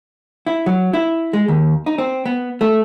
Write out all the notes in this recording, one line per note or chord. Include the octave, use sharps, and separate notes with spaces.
E4
F#3
E4
G#3
D#2
D#4
C4
B3
A3